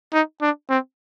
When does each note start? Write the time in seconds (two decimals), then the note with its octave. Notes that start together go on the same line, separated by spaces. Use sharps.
0.13 D#4
0.42 D4
0.69 C4